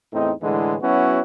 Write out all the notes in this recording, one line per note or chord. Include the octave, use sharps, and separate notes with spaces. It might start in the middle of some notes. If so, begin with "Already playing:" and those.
E2 A2 C4 D#4
A2 D3 E3 G#3
F#3 B3 C#4 E4 F#4